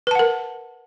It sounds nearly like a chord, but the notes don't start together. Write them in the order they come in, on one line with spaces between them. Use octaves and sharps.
B4 A5 F#5 A#4